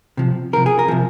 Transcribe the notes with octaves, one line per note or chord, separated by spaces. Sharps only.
C3 F3
C3 F3 A#4
G#4
A#4
C3 F3